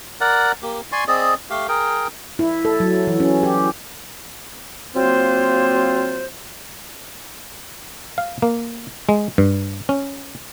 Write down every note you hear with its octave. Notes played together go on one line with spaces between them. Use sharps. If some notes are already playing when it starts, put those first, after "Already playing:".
A#4 D5 F#5
A#3 G4
D5 G#5 C6 C#6
C4 G#4 D5 D#5
A3 G4 F5
G#4 A#4 G5
E4
A4
F#3
E3
C#4
G4
F#3 A#3 C4 F4 C5
F5
A#3
G#3
G2
C#4